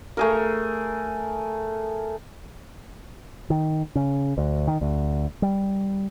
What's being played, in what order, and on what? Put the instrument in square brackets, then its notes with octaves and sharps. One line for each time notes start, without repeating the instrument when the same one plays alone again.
[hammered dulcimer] A3 G#4 A#4
[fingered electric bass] D#3
C#3
D2
D#3
D2
G3